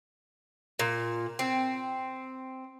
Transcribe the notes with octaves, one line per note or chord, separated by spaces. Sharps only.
A#2
C4